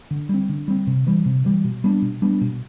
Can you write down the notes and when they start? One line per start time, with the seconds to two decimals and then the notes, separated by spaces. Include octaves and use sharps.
0.11 D3
0.29 G3 C4
0.49 D3
0.68 G3 C4
0.87 C3
1.07 E3 G3
1.26 C3
1.45 E3 G3
1.64 B2
1.84 G3 B3 D4
2.02 B2
2.22 G3 B3 D4
2.41 B2